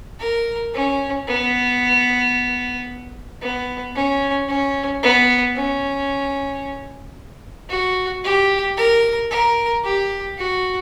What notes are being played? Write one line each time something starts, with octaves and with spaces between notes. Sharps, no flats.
A#4
C#4
B3
B3
C#4
C#4
B3
C#4
F#4
G4
A#4
A#4
G4
F#4